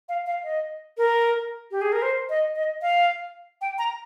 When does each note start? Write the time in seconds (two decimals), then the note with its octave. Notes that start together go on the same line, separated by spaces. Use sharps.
0.09 F5
0.26 F5
0.44 D#5
0.98 A#4
1.71 G4
1.81 G#4
1.92 A#4
2.02 C5
2.29 D#5
2.56 D#5
2.82 F5
3.61 G5
3.78 A#5